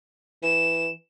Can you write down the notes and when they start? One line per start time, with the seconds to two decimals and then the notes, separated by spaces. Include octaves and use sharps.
0.43 E3 E7